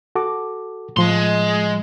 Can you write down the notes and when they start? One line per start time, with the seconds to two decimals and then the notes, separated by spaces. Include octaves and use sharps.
0.15 F#4 A4 D6
0.97 A2 F3 G#3 C6